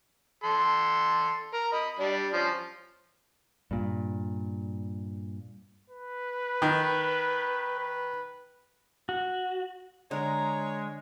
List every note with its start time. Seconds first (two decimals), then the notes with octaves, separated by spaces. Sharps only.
0.44 A4 C6
1.53 A#4
1.73 D#5 B5
1.99 G3 D4
2.33 F3 C#4
3.71 G2 A#2
5.90 B4
6.62 D#3
7.79 B4
9.09 F#4
10.11 D3 G#3 A#4 C#5 A#5